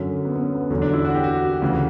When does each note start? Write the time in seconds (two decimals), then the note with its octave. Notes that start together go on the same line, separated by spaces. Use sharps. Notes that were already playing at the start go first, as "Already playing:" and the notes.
Already playing: F#2 D3 F#3 C#4
0.25 B3
0.35 B3
0.41 C#4
0.55 B3
0.70 E2 D3 F#3 C#4
0.82 D4
0.93 E4
1.05 F#4
1.14 G4
1.24 F#4
1.62 D2 C#3 E3